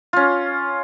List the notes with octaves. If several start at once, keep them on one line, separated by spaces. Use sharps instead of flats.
C#4 F4